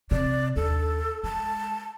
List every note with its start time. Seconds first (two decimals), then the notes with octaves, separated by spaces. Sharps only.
0.11 C3 D5
0.56 D#2 D4 A4
1.23 G#3 A5